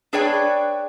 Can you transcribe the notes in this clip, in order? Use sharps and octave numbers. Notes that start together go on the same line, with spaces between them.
D4 G#4 B4 C#5 D5 G5